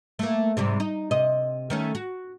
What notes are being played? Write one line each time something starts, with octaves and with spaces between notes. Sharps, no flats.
A3 A#3
G#2 C3 G3
D#4
C3 D#5
D#3 A3 C#4
F#4